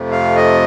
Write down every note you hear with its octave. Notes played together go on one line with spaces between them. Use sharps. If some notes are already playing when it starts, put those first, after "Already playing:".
Already playing: F2 C3 F3 A3
F5
D#5